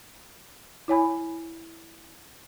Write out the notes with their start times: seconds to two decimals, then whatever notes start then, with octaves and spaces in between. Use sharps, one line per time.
0.88 E4 C#5 G#5 B5